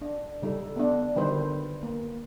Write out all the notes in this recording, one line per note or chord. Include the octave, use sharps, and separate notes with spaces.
D4
C#3 G3 D#4 A4
B3 D4
D3 D#3 G3 F#4 B4 C5
A#3